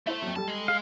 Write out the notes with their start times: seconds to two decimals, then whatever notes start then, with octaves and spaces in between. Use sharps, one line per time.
0.07 A3 E4 C5
0.22 F2 F#3
0.36 G3 A4 A5
0.48 G#3
0.68 G#4 F5